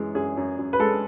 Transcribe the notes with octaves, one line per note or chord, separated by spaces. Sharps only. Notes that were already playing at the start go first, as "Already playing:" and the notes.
Already playing: F#2 E3 G#3
F#2 G#4
F#2
F#2
B4
G#3 A4